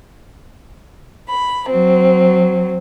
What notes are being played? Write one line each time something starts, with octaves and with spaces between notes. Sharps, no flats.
B5
F#3 C4